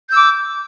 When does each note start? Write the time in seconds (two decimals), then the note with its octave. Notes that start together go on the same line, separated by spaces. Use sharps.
0.09 G6
0.11 E6
0.14 D6